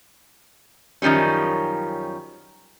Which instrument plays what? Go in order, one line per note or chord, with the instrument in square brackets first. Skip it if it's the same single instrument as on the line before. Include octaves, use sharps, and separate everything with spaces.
[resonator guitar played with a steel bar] F#2 D#3 F3 G3 C#4